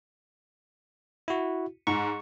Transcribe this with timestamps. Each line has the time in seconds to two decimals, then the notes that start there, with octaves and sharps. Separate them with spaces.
1.28 E4 F#4
1.87 G#2 C#6